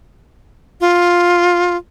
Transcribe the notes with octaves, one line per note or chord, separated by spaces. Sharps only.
F4